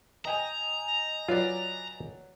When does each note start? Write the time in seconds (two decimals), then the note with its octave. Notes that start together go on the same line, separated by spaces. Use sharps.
0.25 D#5 G5 G#5 A#5
1.28 F#3 F4 B4 D5